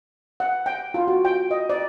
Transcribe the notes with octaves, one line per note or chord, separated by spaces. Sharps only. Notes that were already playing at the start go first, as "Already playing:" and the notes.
F#5
G5
F4
F#4
G5
D#5
D5